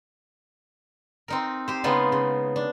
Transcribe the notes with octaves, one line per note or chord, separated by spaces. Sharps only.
C4 D#4 A#4
G4 C5
C#3 G#3 B3 D#4 F4
C#3
D4